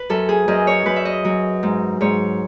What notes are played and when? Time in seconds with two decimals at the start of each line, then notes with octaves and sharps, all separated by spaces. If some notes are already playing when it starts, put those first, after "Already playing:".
Already playing: B4
0.10 F#2 A4
0.29 G#4
0.48 F#2 D#5
0.67 C#5
0.86 F#2 B4
0.96 E5
1.05 D#5
1.25 F#3
1.63 G#2
2.01 G#2 C#5